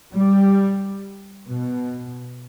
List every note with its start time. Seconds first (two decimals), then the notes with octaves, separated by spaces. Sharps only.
0.13 G3
1.46 B2